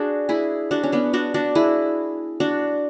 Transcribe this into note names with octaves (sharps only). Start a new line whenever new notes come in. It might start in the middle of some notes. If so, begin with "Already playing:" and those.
Already playing: D4 F#4 G#4
E4 G#4
D4 F#4
C#4
B3 D4
D4 F#4
D4 F#4
E4 G#4
D4 F#4